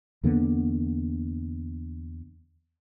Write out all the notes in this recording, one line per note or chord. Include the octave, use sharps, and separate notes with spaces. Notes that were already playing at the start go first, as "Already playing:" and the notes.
E2 D3 A#3 B3